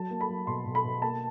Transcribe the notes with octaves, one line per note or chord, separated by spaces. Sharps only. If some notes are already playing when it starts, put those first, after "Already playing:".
Already playing: F#3 A5
A#3
B5
F#3
B2 C6
B2
B5
B2
A#3 A5